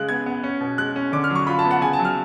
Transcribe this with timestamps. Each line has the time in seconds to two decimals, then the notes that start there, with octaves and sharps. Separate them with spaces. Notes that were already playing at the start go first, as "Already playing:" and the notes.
Already playing: C#3 G#3 F#6
0.09 B3 G#6
0.26 B3
0.43 C#4
0.60 B2
0.78 G#3 F#6
0.96 C#4
1.12 D3 D6
1.24 F6
1.30 F#3
1.36 C#6
1.47 F4 B5
1.59 A5
1.64 B3
1.71 F#5
1.81 C#3 G#5
1.93 A5
1.99 F#3
2.05 F6